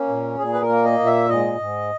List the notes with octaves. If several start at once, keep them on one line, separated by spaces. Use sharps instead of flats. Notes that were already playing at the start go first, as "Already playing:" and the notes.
Already playing: A#3 C#4
A#2
A#2 G#4
B4
A#4
A#3
D#5
A#2
E5
G#2 D#5
G#2